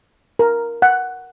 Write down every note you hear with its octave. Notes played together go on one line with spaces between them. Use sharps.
A#4
F#5